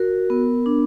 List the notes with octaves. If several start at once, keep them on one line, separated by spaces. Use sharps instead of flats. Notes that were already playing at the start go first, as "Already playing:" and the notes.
Already playing: F#4 A#4
B3
D4